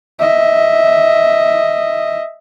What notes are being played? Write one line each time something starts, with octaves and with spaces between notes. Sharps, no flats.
D#5 E5